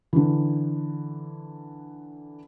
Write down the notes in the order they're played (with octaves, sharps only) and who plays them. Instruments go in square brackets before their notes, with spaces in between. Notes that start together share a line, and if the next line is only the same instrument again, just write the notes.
[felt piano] D3 E3